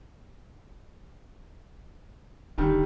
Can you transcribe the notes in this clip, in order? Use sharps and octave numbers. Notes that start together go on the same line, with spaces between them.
D#1 D3 D#3 G3